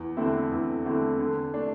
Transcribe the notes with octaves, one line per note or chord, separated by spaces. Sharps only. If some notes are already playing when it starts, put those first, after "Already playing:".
Already playing: E2
D3 A3 C4 E4
E2
D3 A3 C4 E4
D3
A3 D4